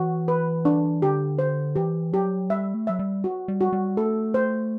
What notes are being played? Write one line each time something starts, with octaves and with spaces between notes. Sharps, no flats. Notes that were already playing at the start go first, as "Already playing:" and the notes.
Already playing: E3 F#4
B4
D4
D3 G4
C5
E3 G4
F#3 G4
G3 E5
A3
F#3 E5
G3
F#4
G3
F#4
G3
A3 A4
C5